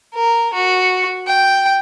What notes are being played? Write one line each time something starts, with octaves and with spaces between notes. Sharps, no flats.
A#4
F#4
G5